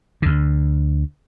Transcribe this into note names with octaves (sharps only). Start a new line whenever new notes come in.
D2 D3